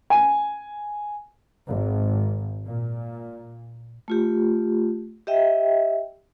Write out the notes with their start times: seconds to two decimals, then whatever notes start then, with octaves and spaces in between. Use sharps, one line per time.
0.10 G#5
1.69 G#1
2.66 A#2
4.08 A3 F4 G4
5.27 G4 D#5 E5 G5